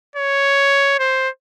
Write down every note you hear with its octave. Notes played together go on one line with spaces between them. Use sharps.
C#5
C5